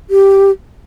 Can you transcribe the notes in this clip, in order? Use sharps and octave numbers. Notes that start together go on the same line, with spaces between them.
G4